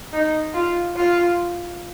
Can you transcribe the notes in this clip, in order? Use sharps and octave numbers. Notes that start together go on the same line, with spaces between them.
D#4
F4
F4